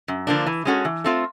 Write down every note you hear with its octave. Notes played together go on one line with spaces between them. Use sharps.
F#2
D3 F3 A#3 D4
E3
G#3 C#4 F#4 A4
E3
A3 C4 F4